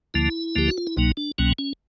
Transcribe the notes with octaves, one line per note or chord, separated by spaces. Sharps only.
D2 D3 F3 A#3 E4
D2 D3 F3 A#3 G4
F#4
F4
E4
C2 B2 F#3 A#3 D#4
D4
C2 B2 F#3 A#3 C#4
C#4